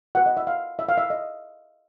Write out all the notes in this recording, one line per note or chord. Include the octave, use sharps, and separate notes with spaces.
F#4 B4 F#5
D#5
E5
F5
E5
F5
E5
D#5